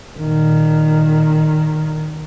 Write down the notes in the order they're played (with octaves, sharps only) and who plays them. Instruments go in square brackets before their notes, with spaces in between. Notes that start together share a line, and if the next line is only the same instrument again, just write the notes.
[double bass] A#2 D#3